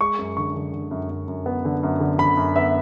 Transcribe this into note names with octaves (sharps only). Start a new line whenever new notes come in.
G#3 C#6
F#2
D3 C#6
D3
D3
F#2
F#2
F#2
B3
D3
F#2
D3
D3 B5
F#2
B3 E5